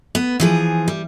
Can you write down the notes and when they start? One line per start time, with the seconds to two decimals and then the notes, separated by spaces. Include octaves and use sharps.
0.15 B3
0.40 E3 F3 G#4
0.88 G3